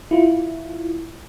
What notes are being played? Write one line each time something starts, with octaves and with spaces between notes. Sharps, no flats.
E4 F4